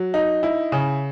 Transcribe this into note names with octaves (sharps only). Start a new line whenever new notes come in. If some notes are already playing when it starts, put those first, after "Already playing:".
Already playing: F#3
D#4
E4
C#3